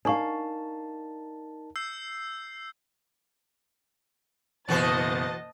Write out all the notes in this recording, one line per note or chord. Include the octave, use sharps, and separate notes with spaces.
D4 D#4 A#4 D5 F5 A5 C#6
E6 G6 C7
F#1 B2 E3 F#4 C5 D#5 A5 A6